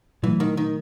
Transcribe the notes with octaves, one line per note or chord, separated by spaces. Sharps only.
A#2 E3 F#3 A3
D#3
D#3